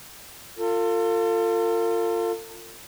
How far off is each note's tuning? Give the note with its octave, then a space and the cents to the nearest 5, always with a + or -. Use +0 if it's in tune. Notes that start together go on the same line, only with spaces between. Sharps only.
F4 +0 A4 +40